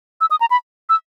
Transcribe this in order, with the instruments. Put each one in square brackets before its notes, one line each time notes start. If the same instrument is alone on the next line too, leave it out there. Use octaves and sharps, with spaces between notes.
[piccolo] E6
D#6
A#5
B5
E6